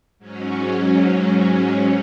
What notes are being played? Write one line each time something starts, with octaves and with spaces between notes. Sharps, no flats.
G#2 F#3 C#4